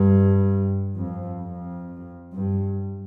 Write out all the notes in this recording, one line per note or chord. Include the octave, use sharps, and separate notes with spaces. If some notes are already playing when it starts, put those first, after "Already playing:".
Already playing: G2
F2
F2
G2